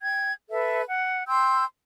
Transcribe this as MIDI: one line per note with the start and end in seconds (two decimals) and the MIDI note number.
0.01 0.32 79
0.01 0.32 92
0.50 0.82 69
0.50 0.82 71
0.50 0.82 76
0.87 1.25 78
1.27 1.63 79
1.27 1.63 84
1.27 1.63 88
1.27 1.63 91